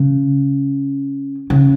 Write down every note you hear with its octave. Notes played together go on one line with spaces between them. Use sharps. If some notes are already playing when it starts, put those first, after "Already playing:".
Already playing: C#3
C#3